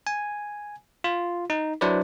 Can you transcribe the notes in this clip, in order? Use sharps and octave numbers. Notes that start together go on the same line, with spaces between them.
G#5
F4
D#4
F#3 D4 E4 B4 C5 D5